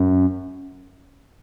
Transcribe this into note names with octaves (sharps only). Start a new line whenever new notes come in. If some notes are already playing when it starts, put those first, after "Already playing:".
Already playing: F#2